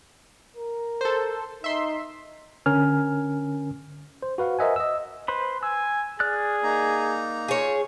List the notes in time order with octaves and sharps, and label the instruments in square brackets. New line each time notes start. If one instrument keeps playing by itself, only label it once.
[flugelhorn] A#4
[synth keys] A4 C5
[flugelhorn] D#4 [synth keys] E5 C6
[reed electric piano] D3 C#4 A#4 G#5 F6
[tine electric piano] C5
F#4 B4 F5 F#5
A#4 C5 D#5 E5 F#5 G#5
D#5 E6
[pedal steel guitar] B4 C5 B5
[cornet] G#5 [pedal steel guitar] E6
[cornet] G#4 [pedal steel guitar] D5 F6 F#6
[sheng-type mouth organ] A#3 D#4 A#5
[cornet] F4 [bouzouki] G#4 C#5